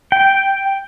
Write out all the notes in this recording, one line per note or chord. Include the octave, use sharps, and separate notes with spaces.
G5